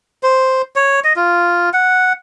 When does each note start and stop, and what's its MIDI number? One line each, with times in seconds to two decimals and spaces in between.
0.23 0.62 72
0.76 1.00 73
1.04 1.13 75
1.16 1.70 65
1.73 2.13 78